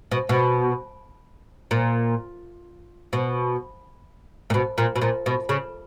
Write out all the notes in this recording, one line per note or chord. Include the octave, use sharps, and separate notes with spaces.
B2
B2
A#2
B2
A#2
B2
A#2
B2
A#2
B2
C#3